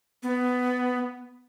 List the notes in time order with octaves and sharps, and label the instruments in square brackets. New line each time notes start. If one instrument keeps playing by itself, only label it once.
[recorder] B3